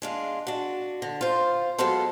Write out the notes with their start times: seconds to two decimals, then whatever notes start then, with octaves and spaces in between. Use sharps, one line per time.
0.02 G#3 D4 F4
0.47 D4 F#4
1.02 D3
1.21 F4 C5
1.78 F#3 G#3 B3 F4 A4 C5